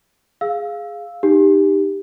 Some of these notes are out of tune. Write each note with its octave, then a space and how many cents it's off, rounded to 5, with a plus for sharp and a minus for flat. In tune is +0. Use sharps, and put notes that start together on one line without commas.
G#4 +0 F5 +0 E6 -5
D#4 -20 G4 +5